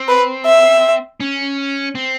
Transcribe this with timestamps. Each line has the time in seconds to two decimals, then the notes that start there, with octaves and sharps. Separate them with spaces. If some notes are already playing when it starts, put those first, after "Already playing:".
Already playing: C4
0.08 B4
0.46 E5
1.20 C#4
1.95 C4